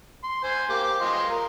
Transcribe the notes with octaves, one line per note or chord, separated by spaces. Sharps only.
C6
C5 G#5
A#3 G4
G4
F4 D#5 C6
A#4